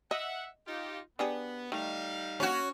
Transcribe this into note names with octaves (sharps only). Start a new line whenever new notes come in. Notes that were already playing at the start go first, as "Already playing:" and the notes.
D#5 E5 F#5
D#4 F4 G4
B3 D4 G4 G#4
D#3 G3 A3 D#4 F5
A#3 C#4 F#4